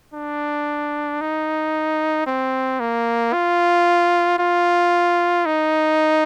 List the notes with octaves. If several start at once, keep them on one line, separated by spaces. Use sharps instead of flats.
D4
D#4
C4
A#3
F4
F4
D#4